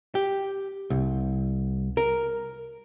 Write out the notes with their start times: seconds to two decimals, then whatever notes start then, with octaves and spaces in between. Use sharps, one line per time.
0.15 G4
0.90 C2
1.97 A#4